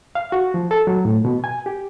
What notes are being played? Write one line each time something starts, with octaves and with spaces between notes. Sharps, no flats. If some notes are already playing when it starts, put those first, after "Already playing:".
F5
F#4
F3
A4
F#3
A2
B2
G#5
G4